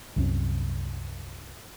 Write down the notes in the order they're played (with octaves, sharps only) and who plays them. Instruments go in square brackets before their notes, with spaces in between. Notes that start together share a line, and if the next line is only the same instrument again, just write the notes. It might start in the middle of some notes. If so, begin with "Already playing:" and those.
[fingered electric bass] C2 F#2 C3 C#4